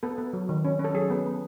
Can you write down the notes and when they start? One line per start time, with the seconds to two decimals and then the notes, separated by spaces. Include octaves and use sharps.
0.03 B3 A4
0.18 B3
0.33 F#3
0.49 D#3
0.65 C#4
0.79 C#4 A4
0.95 F#3 G#4
1.10 B3
1.26 B3